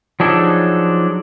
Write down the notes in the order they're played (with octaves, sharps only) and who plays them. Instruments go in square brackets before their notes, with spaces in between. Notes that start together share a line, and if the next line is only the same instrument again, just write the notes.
[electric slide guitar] F3 F#3 D4 D#4 G#4 A4